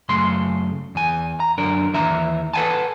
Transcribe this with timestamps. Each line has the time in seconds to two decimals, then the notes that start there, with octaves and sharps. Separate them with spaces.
0.09 F#2 C#3 A3 C6
0.95 E2 G#5
1.40 A#5
1.58 F#2 D3 D4 A#4
1.93 D#2 E3 E5 A#5
2.54 A4 B4 F5 F#5 G#5 A5